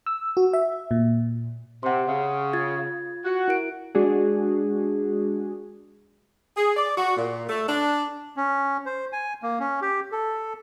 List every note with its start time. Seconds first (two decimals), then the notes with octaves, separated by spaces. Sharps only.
0.06 E6
0.37 F#4
0.53 E5
0.91 A#2
1.83 C3 F#5 C6
2.07 C#3
2.53 F4 G#6 A6
3.25 F#4
3.48 E4 A#4 D7
3.95 G#3 D4 F#4 G#4
6.56 G#4
6.77 D5
6.97 F#4
7.16 A#2
7.48 A3
7.69 D4
8.37 C#4
8.86 C5
9.13 G#5
9.43 A#3
9.60 C#4
9.82 G4
10.12 A4